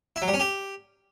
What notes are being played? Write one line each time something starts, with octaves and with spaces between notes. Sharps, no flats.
E4
F#3
G3
C#4
G4